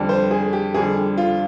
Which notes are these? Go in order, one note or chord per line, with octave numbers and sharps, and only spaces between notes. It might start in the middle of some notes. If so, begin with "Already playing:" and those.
Already playing: F2 D3 G3
C5
G#4
G4
F2 D3 G3 G#4
F4